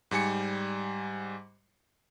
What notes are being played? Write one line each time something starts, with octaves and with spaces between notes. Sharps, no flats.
G#2 G3 G#5 C#7